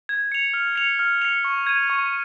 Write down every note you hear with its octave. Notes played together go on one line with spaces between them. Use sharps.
G#6
C#7 F7
F6
C#7 F7
F6
C#7 F7
C#6
G#6 D#7
C#6